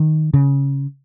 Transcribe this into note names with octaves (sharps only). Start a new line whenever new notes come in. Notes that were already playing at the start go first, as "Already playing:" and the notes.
Already playing: D#3
C#3